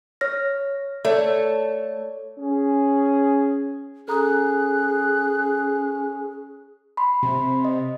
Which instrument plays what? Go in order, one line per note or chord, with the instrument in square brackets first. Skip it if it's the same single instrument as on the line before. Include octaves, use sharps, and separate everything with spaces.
[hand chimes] C#5 F6 A#6
[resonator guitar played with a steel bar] A3 [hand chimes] C#5 D5
[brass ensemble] C#4 G#4
[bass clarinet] C#4 [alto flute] G#4 [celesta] A4 A#5 D#6 [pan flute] F#6
[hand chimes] B5 C6
[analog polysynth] C3
[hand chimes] D#5